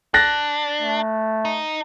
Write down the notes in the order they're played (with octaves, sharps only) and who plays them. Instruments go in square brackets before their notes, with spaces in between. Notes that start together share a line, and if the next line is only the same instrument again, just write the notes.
[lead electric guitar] D4 [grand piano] F#6 A6 A#6
[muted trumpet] A3
[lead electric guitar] D#4